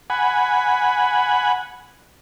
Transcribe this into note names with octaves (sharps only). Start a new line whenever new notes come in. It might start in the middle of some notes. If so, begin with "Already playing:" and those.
F#5 G#5 B5